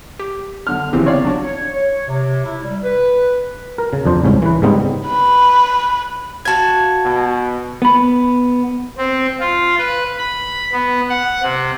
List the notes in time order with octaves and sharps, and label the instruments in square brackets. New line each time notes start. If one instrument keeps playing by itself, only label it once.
[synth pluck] G4
[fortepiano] D3 F6
[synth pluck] G1 C4 G4 [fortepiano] C#3 E3
[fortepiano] C#5 D5 F5
[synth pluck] F#3 D4 F#4
[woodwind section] C#5
C#5
C3
E4
G3
B4
[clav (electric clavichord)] A#4
C#3
F2 D4 C5
C2 G#2 C#4
E3 B4
G#2 C#3 G3 B3 C4 D#4
[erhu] B4
[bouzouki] F#4 F5 [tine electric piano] A5 G#6
[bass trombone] B2
[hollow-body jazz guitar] B3 B5
[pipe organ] C4
F4
B4
B5
B3
F#5
C3